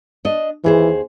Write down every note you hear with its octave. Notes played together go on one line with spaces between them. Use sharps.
D4 D#5
D#2 E3 G#4 C5